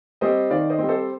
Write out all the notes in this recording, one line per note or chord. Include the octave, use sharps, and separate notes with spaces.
G3 C4 C5 D#5
D#3 D5 F5
C5 D#5
G3 C4
A4 C5